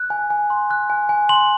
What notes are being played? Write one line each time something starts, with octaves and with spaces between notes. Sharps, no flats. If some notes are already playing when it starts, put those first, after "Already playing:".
Already playing: F#6
G#5
G#5
C6
F#6
G#5
G#5
C6 F#7